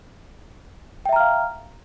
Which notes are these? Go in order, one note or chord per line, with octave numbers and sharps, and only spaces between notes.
E5 F5 G5 A#5 F6